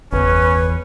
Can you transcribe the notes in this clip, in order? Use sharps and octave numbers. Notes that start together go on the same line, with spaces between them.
G1 E2 C#4 B4